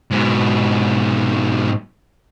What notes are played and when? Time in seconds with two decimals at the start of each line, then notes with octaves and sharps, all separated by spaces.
0.11 G#2 B2